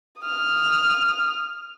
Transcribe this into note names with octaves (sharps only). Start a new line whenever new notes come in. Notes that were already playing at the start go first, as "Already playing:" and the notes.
D#6 F6